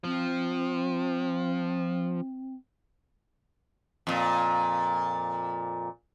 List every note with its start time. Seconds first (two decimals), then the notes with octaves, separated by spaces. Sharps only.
0.04 F3 C4
4.07 F2 A#2